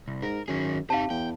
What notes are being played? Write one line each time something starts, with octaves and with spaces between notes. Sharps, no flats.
C2
G#2 A#4
F#2 D#3 G#4
C3 D#4 C5 F5 A5
E2 G5